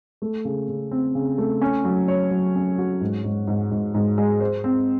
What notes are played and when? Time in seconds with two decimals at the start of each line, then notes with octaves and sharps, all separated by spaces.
0.22 A3
0.45 C#3
0.69 C#3
0.91 C4
1.15 C#3
1.38 A3
1.61 C#4
1.84 F#3
2.08 C#5
2.31 F#3
2.55 C#4
2.78 F#4
3.01 G#2
3.24 G#2
3.47 G#2
3.71 G#2
3.94 G#2
4.18 G#3
4.40 C5
4.64 C4